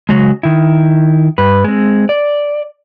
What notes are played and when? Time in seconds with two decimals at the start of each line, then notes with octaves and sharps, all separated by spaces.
0.09 C#3 F#3 G#3
0.43 D#3 E4
1.38 G2 B4
1.64 G#3 C4
2.09 D5